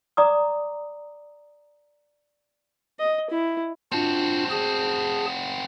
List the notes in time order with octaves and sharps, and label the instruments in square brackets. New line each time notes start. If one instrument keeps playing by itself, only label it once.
[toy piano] D5 A#5 D6 D#6
[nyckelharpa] D#5
E4
[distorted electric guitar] C4 F#4 [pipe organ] D4 F4 A5
[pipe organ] G#4 A5